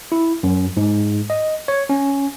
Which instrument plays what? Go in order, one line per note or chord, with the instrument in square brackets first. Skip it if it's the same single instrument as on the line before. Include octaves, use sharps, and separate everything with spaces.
[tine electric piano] E4
F#2
G#2
D#5
C#5
C#4